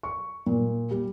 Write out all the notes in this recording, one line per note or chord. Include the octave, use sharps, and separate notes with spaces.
C#6
A#2
G3